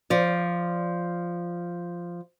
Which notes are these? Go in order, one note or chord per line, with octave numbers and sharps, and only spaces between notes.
F3 D5